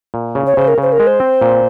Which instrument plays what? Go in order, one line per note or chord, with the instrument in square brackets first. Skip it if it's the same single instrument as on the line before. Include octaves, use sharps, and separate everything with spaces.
[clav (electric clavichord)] A#2
C#3
[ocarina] C#5
[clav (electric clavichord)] C#3 [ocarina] C5
[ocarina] A#4
[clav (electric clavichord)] C#3 [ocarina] C5
[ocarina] A#4
[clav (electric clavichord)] G#3
[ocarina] C5
[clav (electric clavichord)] C4
A#2